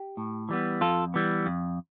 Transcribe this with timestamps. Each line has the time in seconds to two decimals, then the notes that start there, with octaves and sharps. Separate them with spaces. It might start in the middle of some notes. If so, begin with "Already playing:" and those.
Already playing: G4
0.17 A2
0.49 E3 G3 B3
0.81 F2 F4 A4
1.14 E3 G3 B3
1.46 F2